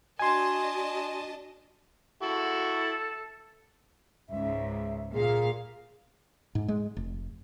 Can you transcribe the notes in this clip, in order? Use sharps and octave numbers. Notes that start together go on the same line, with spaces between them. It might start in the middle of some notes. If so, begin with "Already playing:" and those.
D4 F#4 D#5 G#5 A5 C6
E4 F#4 A4
C#2 G#2 E5
A#2 G#4 F5
G#2
G#3
F1